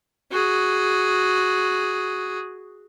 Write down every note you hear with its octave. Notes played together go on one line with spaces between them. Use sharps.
F#4 G#4